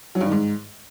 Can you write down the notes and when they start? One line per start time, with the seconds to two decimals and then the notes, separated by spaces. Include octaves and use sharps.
0.15 F#3
0.21 G2
0.26 D#3
0.32 G#2